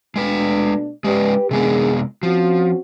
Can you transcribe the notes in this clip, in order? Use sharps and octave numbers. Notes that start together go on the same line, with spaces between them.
B2 G#3 A3 D4 B4
G#3 C#4 G4 B4 D5
C3 D#3 G#3 B3 D4 G#4
F3 C4 C#4 F#4